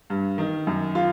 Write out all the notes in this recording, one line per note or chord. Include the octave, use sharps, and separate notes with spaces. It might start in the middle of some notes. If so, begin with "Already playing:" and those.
G2
D#3
F#2
F4